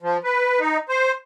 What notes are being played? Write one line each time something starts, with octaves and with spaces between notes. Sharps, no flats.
F3
B4
D#4
C5